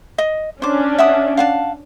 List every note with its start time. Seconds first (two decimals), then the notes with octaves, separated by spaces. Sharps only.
0.18 D#5
0.62 C#4 D4 C5 D6
0.98 E5 F#5 D#6
1.37 F5 F#5 A5